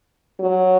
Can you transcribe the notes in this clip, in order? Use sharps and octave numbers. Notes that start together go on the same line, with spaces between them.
F#3